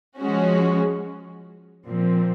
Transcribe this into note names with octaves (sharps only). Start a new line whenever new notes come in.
F3 G#3 C#4 F#4
A#2 F3 C4